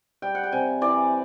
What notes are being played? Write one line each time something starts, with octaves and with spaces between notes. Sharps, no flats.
G3 G5
F#5
G5
C3 G#5
E3 D5